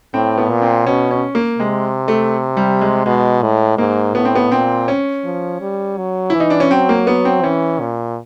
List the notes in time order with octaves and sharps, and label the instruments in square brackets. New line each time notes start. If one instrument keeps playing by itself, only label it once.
[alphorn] A2 [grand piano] C4
[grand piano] B3
[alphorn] A#2
[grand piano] C4
[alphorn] B2 [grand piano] C#4
[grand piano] C#4
A#3
[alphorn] C3 [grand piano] G#3
[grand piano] A3
G3
G#3
[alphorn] B2 [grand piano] G#3
[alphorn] A2
[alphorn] G#2 [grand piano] A#3
[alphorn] A2 [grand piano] B3
[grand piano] C4
B3
[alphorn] A#2 [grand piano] C4
[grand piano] C#4
[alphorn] F3
G3
F#3
[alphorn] E3 [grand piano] E4
[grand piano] D#4
D4
C#4
[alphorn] F#3 [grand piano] C4
[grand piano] A#3
B3
C4
[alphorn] E3 [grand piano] C#4
[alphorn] A#2